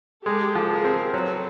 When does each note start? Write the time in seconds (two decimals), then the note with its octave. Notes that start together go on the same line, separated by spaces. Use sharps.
0.25 G#3 G4 A4
0.55 F3
0.70 G#4 A#4
0.84 C4
1.13 F#3 A4 B4